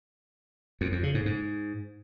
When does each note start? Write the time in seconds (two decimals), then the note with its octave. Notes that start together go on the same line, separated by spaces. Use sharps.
0.81 F2
0.92 F2
1.03 C#3
1.14 G#2
1.26 G#2